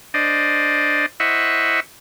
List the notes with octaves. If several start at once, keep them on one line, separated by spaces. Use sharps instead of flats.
D4 C5 D5 D#5
E4 C5 D#5 E5 F#5 C#6